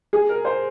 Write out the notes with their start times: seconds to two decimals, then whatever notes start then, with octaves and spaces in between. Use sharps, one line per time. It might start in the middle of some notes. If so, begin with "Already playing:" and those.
0.13 G#4
0.29 A#4
0.45 C5